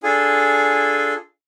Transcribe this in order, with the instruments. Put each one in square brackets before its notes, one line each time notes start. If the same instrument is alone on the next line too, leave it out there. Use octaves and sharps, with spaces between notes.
[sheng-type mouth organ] D4 F4 G#4 A4 G#5